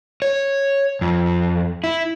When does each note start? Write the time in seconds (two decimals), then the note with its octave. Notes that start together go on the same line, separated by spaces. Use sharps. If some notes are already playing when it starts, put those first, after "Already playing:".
0.22 C#5
1.01 F2
1.84 E4